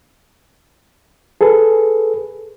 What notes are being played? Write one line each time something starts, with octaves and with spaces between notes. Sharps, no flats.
G#4 A4 B4